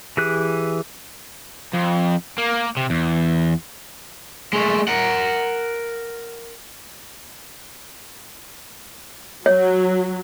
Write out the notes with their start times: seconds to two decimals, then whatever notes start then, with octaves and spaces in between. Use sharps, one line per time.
0.17 E3 G4 G#4 F#6
1.73 F2
2.38 A#3
2.77 C3
2.90 E2
4.53 G#3 A3
4.88 A#4 F#5
9.46 F#3 C#5